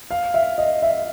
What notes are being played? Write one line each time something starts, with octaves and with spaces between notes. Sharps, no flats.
F5
E5
D#5
E5